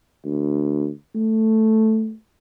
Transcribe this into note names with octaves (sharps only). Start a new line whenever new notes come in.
D2
A3